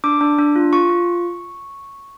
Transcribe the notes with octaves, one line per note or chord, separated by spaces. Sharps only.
D4 D6
D4
D4
F4
F4 C#6
F4